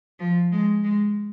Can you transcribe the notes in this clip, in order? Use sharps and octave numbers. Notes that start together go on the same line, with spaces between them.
F3
G#3
G#3